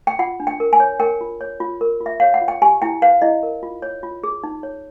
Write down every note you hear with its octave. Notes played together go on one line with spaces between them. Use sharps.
G5
F4 F#5
D4
G5
A#4
G#5
C#5
A#4 G5
F4
C#5
F4
A#4
F4
E5
C#5 F5
F#5
F4
G5
G4 G#5
E4 G5
B4 F5
E4 D#5
A#4
F4
C#5
F4
G#4
D#4
C#5